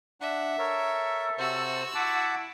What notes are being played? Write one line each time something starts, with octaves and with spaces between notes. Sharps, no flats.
D4 E5 F#5
A4 A#4 C#5
C3 F#4 C5 E6
E4 F#5 A5 D6